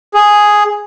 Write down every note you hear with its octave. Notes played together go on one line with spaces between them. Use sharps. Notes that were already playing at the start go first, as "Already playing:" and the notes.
G#4